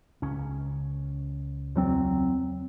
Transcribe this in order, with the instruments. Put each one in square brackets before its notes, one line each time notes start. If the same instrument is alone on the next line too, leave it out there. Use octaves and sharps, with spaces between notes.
[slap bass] C#2 C#4
[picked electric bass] E2 F#3 C4